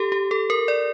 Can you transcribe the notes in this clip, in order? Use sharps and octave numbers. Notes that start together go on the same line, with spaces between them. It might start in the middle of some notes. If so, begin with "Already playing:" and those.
Already playing: G4 A4
G4
A4
A#4
D5